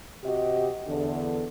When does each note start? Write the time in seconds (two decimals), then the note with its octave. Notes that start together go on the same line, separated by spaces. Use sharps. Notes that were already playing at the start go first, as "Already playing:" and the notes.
0.23 C3 F#4 G4 D#5
0.87 E2 D3